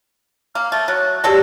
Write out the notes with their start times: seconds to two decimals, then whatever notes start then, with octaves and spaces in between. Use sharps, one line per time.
0.55 A#3 F6
0.72 A3 A6
0.88 F#3 F#6
1.24 B2 F#3 G4 A4 D5 A#6